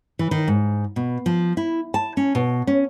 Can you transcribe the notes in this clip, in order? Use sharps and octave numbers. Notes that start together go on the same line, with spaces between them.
E3
D#3
G#2
B2
F3
E4
A5
C#4
B2
C#4